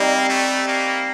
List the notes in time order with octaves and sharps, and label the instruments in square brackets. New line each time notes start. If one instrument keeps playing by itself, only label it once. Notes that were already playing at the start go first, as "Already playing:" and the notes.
Already playing: [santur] G3 C4 D#4 [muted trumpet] A#3
[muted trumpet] A3
A#3